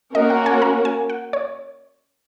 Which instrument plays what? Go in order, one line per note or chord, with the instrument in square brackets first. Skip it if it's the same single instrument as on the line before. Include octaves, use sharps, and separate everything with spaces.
[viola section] A#3 C#4 F#4 A#4 [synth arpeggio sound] D#5
[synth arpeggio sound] F#5
G#5
A#5
G#5
F#5
C#5